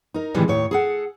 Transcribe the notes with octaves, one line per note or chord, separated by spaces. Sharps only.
D#4 A#4
A2 C3 D#3 E3 G3 G#3
D#2 A2 C#5
G#4 A4 F#5